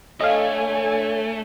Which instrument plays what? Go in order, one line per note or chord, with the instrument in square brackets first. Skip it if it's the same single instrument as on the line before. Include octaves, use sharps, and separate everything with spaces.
[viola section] D3 G#5 [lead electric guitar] A3 [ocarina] C#5 [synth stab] D#5 F5